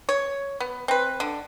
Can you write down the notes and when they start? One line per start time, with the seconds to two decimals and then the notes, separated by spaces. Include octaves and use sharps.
0.09 C#5
0.60 B3
0.88 C4 B4
1.20 D3